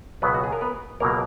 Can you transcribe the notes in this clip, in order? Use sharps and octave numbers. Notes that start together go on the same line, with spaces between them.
C#2 B2 F#3 B3 B4
F#4
G#4
A#4
B3 B4
C#2 B2 F#3 A#3 A#4